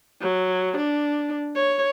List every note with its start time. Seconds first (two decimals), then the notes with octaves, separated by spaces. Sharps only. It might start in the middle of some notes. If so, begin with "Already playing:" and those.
0.21 F#3
0.77 D4
1.55 C#5